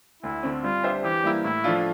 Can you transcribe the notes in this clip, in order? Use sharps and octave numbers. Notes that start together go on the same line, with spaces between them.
D2 E4
D3 A3 C4
G3 F4
D4 G4 C5 E5
E3 G4
G3 A#3 E4
A2 E4
F3 A3 D4 F4